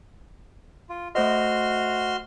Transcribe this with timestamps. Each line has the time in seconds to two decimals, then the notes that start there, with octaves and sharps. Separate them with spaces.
0.89 F4
1.15 A3 F#4 C5 D#5 C6 F6